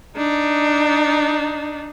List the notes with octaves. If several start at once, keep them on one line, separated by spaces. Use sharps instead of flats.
D4 D#4